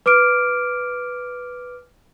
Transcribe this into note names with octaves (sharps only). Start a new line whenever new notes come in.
B4 D6 F6 D7